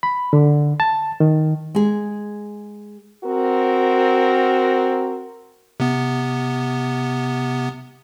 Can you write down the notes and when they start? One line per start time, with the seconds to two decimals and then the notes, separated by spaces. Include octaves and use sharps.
0.03 B5
0.33 D3
0.80 A5
1.20 D#3
1.75 G#3 G#4
3.24 C4 F#4 A#4
5.80 C3 B3